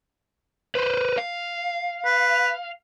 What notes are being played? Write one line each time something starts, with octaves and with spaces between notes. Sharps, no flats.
B4 C5
F5
B4